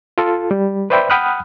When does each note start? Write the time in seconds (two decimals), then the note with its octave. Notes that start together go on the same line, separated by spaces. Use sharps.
0.18 F4 A4
0.51 G3
0.90 B4 C5 D5 E5 G5 B5
1.10 F#5 G5 B5 D#6 F6 F#6